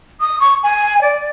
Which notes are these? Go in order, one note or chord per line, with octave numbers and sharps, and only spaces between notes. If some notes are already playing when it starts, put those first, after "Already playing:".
D#6
C#6
G#5
D5